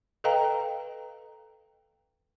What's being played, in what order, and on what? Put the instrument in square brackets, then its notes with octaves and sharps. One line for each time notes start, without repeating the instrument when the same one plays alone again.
[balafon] A4 B4 D#5 F5 G5 A#5